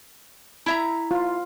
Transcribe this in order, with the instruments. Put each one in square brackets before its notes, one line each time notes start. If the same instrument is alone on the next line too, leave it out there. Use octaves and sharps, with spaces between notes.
[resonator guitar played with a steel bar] E4 E5 A#5
[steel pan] F4